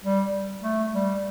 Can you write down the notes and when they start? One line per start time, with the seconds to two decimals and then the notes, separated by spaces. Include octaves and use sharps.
0.04 G3
0.63 A3
0.94 G3